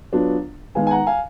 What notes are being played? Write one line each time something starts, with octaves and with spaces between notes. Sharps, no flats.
F#3 B3 D4 F4
D#3 G#3 B3 F5 G#5
G#5
F#5 A#5
F5 G#5